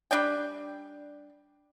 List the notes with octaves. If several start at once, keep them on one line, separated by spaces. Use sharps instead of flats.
G3 D4 D5 G5